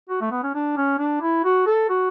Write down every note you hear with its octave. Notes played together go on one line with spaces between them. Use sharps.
F#4
A3
B3
C#4
D4
C#4
D4
E4
F#4
A4
F#4